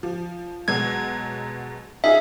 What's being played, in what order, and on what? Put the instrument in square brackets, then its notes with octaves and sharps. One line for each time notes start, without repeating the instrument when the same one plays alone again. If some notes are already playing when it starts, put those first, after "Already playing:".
[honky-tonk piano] F3
[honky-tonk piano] B2 F#3 G#3 [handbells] G#6
[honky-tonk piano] D#4 F4 G#4 [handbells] E5